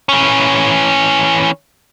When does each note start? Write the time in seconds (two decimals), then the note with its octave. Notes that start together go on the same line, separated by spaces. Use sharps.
0.09 E3 C#4